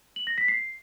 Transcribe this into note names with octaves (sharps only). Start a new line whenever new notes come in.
F#7
A#6
B6
C7